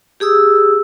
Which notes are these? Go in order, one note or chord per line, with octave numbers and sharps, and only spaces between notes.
G4 G#4 D#6 E6